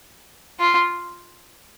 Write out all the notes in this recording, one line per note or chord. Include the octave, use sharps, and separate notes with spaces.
F4